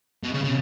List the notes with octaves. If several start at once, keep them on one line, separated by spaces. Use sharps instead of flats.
B2
C#3
C#3